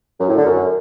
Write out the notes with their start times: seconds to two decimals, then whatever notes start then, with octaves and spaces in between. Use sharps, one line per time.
0.20 F#2
0.29 A2
0.37 D3
0.46 F#2